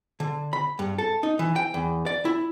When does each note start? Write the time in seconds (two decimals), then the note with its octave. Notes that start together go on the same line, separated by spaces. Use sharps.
0.20 D3
0.53 B5
0.79 G2
0.98 A4
1.23 D#4
1.39 E3
1.56 G5
1.74 E2
2.06 D5
2.25 E4